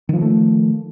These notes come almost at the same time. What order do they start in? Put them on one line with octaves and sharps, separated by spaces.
D#3 F3 A#3 A3